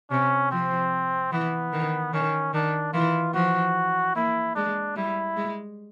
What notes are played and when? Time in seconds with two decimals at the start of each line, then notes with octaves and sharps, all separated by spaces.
0.10 C3 C#4
0.51 F3 C4
1.32 E3 B3
1.73 D#3
2.13 D#3 C#4
2.54 D#3 D4
2.93 E3 F4
3.34 F3 F#4
4.15 A#3 E4
4.55 G#3 D4
4.96 G3 E4
5.36 G#3